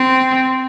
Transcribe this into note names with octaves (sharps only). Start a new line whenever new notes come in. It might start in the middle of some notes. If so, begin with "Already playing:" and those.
Already playing: C4